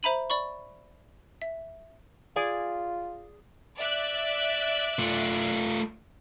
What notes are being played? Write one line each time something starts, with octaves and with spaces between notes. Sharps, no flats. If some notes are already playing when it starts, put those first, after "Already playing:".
C5 E5 A#5 B5 D#7 F#7
D5 B5 C#6
E5
F4 G#4 D5 G#5
D5 E5 F#6
A3 F4